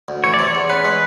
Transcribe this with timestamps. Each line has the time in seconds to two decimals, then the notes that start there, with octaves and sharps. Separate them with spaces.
0.08 D2
0.24 E3 C#5
0.34 D5
0.39 C3
0.44 C#5
0.55 E2
0.70 C#4 B4
0.85 G#3